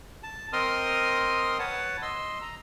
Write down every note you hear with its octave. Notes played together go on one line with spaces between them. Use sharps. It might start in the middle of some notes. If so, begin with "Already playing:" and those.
A5
C4 A#4 D#5 C6 D#6 F6
B4 C#5 F#5 A5
D#5 C6 E6
A#5